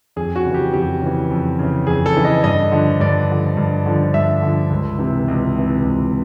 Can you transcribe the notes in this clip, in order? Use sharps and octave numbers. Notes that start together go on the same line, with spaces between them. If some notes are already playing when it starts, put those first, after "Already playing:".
F2 G#4
F#4
C#3
E3 G4
F2 G4
C#3 E3
F2
C#3 E3
F2 G#4
A4
C#3 E3
D#5
G2 D#5
D3 F3
G2 D5
D3 F3
G2
D3 F3
G2 E5
D3 F3
C#2
C3 E3
C#2
C3 E3
C#2